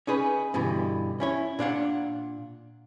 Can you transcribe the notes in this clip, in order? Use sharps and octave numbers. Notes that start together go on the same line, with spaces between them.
C#4 D#4 G#4 B4
G2 B2 D3 E3
C#4 E4 C#5
A#2 D4 F5 F#5